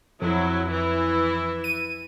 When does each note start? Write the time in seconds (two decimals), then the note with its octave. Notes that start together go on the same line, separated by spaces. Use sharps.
0.22 F2 F#3 E4
0.70 E3 E4
1.64 D#7